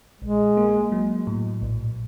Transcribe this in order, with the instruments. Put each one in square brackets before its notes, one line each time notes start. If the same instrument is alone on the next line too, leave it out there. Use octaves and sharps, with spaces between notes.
[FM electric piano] A#1 [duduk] G#3
[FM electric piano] A#3
F#3
A2
A#1